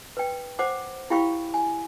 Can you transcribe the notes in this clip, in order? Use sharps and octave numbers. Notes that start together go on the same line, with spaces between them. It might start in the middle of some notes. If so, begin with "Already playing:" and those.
B4 G5
C5 F#5 D6
E4 G4 F5 G5 B5 C#6
G#5